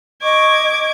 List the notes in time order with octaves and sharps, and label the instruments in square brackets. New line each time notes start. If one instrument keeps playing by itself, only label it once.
[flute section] D#5 C#6 [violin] D6 G#6